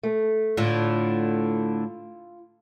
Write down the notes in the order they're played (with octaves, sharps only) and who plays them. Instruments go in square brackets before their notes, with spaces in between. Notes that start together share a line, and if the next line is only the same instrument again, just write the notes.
[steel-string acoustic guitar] A3
[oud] A2 D3 [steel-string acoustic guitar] F4